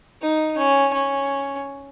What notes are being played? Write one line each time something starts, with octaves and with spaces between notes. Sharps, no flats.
D#4
C#4
C#4